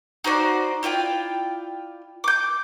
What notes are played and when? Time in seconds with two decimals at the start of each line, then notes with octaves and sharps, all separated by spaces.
0.24 D#4 F#4 C5 D5
0.83 E4 F4 D5 G5
2.24 D6 G6